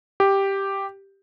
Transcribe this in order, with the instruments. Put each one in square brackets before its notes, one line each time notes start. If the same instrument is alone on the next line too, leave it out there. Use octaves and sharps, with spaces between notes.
[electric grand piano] G4